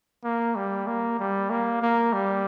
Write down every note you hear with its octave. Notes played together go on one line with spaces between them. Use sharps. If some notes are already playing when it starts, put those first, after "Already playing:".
A#3
G3
A#3
G3
A#3
A#3
G3